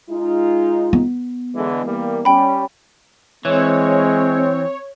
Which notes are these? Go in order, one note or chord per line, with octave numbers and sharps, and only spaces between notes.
G#3 D#4 F4
B3
D3 E3 G#3
E3 G3 A#3
G3 C#4 G5 B5
E3 G#3 C4 C#5